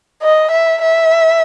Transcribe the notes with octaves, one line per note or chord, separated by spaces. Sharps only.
D#5
E5
E5